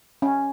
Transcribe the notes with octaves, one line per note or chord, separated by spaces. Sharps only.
C#4